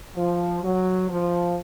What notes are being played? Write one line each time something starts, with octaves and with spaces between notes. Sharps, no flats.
F3
F#3
F3